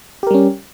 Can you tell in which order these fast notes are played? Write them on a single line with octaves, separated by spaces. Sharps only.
G4 A#4 G3 C#4